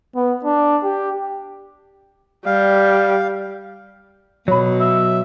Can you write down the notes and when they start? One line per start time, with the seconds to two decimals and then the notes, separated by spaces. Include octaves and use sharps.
0.16 B3
0.45 D4
0.84 G4
2.46 G3 F5
4.48 B2 F#3 C#5 B5
4.80 E5